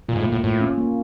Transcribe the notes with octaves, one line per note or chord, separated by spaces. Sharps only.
A#2 F4
G#2
A2
A#3
A2
A2 F4
C#4
A#3